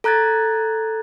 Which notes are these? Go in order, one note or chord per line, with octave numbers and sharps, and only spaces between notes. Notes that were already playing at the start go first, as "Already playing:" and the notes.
A4 A#5 F#6 G#6 A6